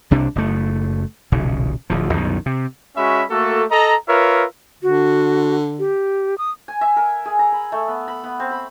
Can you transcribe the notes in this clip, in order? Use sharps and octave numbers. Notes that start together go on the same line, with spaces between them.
C2 C3 D4
F#1 A3
D#1 B1 C#3
D1 D2 F3
C2 F#2 B2 D#3
C3
G#3 C#4 F#4 E5 B5
A3 A#3 F#4 A4
A4 D#5 A#5
F4 A#4 B4 C#5 E5
D3 F#4
G4
D#6
G#5
E5
A#4
G#4
A#5
B5
A3
B3
B5
B3
C4
B5